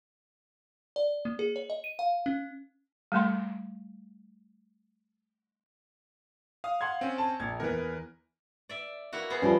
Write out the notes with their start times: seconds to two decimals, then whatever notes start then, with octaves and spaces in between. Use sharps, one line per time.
0.96 D5
1.25 A#3
1.39 G#4
1.56 C#5
1.70 D#5
1.84 D#7
1.99 F5
2.26 C#4
3.12 G3 A3 C6
6.64 F5 D#6
6.81 F#5 C6 G#6
7.01 C4 C#4
7.18 A5
7.40 A#1 G#6
7.60 E2 E3 A#4 B4
8.69 D5 E5
9.13 A#3 E4 F#4
9.30 B3 G#4 C5
9.42 F3 G3 A3 C#4 G4